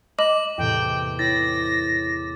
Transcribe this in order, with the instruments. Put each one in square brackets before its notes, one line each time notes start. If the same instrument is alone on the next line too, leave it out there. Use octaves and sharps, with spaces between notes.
[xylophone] D#5 [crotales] D6 [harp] E7 [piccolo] F#7
[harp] E2 A2 C3 [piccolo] G5
[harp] E4 B4 C#5 [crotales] A6 [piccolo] A#6